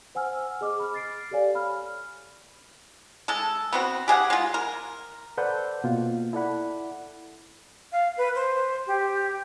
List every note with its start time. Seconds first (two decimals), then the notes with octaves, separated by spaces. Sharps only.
0.15 C5 F#5 G#5 E6 F6
0.61 G#4 D#5 D6 F6
0.79 B5 F6
0.94 A6 C7 D7
1.31 G4 A4 C#5 D5 F5 G#5
1.54 F5 B5 F6
3.28 G#3 A4
3.73 B3 C4 F#4
4.08 G4 G#4 E5 F#5
4.30 G#3 F4
4.54 A#4
5.38 A4 B4 C5 D5 F#5 G6
5.84 B2 A#3 F4
6.33 E4 A4 D5 F#5 B5
7.92 F5
8.18 B4
8.35 C5
8.87 G4